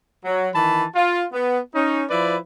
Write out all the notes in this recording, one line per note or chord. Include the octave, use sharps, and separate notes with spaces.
F#3
D#3 E3 A5 B5
F4
B3
C#4 D#4
F3 E4 B4 D5